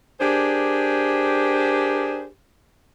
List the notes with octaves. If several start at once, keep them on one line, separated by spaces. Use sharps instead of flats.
D4 G4 G#4 A#4 C5